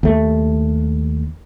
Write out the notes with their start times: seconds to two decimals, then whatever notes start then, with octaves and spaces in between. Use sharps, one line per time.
0.03 D#2 A3